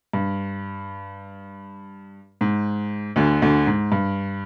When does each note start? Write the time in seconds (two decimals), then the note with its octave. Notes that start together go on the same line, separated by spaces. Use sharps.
0.13 G2
2.41 G#2
3.16 D2 D3
3.42 D2 D3
3.67 G#2
3.92 G2